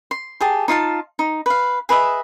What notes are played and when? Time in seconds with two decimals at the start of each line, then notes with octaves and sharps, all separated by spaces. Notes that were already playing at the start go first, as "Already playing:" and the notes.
0.11 C6
0.41 G4 G#4 A5
0.68 D#4 F4 F5 A5
1.19 D#4
1.46 B4 F5
1.89 G#4 B4 D#5 E5